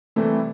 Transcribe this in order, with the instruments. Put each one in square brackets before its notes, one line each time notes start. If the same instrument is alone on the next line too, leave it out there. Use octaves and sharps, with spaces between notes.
[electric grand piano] C3 E3 G3 C4 E4 [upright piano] A3